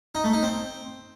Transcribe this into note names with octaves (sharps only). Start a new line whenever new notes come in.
D#4
A3
D#4
C4